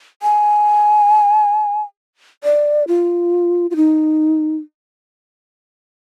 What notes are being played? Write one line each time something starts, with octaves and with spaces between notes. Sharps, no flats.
G#5
D5
F4
F4
D#4